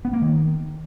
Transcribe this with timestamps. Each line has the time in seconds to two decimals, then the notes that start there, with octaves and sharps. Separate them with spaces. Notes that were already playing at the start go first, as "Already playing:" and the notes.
0.05 B3
0.13 A#3
0.22 D#3